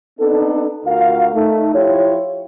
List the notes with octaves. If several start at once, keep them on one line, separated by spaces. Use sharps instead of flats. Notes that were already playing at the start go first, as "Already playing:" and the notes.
B3 C4 D4 D#4 A4
D2 F4 F#4 A#4 F5
A3 D#4
F3 E4 F4 G4 C#5